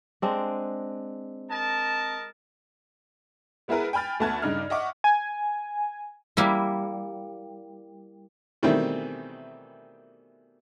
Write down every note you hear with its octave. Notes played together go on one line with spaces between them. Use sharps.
G#3 C4 D4
A#4 D#5 A5
G#3 B3 E4 G#4 A#4 B4
G5 G#5 B5 F6 A6
D2 A3 B3 A5 F#6 G#6
G2 C#3 D4 D#4 F6
D#5 E5 F#5 C#6 D6
G#5
G3 A#3 E4
B2 D#3 E3 G3 A3 C4